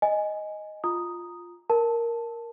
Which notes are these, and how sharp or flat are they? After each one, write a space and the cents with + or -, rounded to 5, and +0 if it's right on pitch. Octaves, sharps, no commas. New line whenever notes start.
D#5 +0 G#5 +0
F4 +0 A#5 +0 D#6 +0
A#4 +0 A5 +0